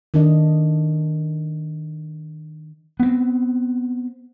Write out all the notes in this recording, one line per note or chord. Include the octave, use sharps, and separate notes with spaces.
D#3 D4 D#5
B3 C4